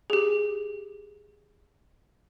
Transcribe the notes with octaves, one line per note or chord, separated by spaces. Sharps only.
G4 G#4